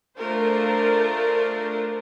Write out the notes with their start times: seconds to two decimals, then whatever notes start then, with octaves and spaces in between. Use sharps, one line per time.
0.17 A3 D4 F4 A#4 C5